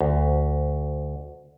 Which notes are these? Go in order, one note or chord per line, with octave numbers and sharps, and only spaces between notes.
D2